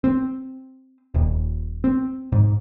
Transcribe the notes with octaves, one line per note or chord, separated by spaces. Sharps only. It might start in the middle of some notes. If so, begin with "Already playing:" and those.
C4
D#1
C4
G#2